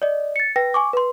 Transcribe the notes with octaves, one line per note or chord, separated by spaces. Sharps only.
D5 D#5
A6 C#7
B4 G5 A#6
G#5 C#6 D6
B4 C6